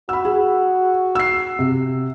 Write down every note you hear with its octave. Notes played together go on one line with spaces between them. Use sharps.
F#4 B5 E6
G#4
E6 C7
C3